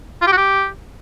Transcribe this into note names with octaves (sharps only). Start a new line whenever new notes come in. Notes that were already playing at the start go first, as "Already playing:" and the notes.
F4
G4
F#4
G4